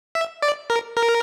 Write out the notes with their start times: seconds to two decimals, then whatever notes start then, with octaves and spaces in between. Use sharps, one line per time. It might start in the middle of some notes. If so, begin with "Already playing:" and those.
0.15 E5
0.42 D5
0.70 A#4
0.97 A#4